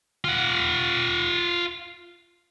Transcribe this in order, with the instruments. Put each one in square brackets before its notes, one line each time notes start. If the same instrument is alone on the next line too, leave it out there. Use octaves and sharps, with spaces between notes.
[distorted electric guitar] F4 F#5